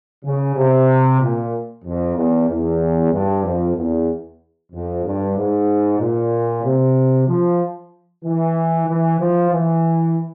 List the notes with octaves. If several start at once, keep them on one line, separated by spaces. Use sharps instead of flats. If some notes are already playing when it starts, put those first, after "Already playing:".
C#3
C3
A#2
F2
E2
E2
G2
F2
E2
F2
G2
G#2
A#2
C3
F3
E3
E3
F3
E3